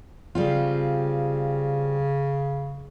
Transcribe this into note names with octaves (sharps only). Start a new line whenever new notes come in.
C#3 G3 C4 F4